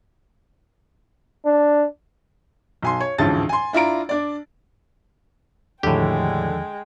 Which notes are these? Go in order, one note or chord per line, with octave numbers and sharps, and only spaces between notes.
D4
B1 G#5 C6
C#5
A1 D2 G#2 F3 A5 A6
G#5 C6
D4 E4 F4 A#5 D7
D4 D5
E2 A2 D3 D#3 F3 G#3 G4 G5